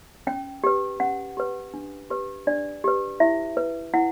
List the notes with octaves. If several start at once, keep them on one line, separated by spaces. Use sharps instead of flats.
C#4 G5
G4 B4
C#4 F#5
G4 B4
D4
G4 B4
D4 D5
G4 B4
E4 E5
B4
E4 F#5